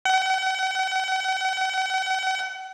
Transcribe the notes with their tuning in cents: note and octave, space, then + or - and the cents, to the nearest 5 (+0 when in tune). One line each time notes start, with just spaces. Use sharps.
F#5 +40